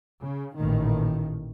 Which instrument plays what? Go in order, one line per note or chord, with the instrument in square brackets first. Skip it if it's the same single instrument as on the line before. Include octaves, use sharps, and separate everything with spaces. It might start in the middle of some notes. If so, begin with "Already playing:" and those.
[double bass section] C#3
A1 A#2 D#3